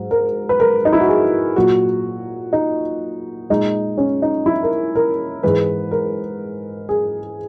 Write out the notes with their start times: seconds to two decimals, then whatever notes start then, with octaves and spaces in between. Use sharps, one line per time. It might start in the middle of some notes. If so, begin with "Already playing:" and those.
Already playing: G#2 F#3
0.11 A#4
0.49 B4
0.60 A#4
0.85 D#4
0.93 E4
1.00 F#4
1.08 G#4
1.56 A#2 F#3 F#4
2.53 D#4
3.50 A#2 G#3 D#4
3.98 C#4
4.22 D#4
4.46 E4
4.63 A#4
4.95 A#4
5.43 G#2 E3 G#3 B4
5.91 A#4
6.89 G#4